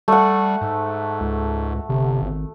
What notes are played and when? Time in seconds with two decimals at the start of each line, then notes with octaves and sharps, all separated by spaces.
0.08 G3 A3 F#5
0.61 G#2
1.20 C#2
1.89 G1 C3
2.22 G#1